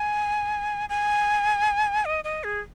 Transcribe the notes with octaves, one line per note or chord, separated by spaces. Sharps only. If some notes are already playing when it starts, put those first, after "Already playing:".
Already playing: G#5
G#5
D#5
D#5
G#4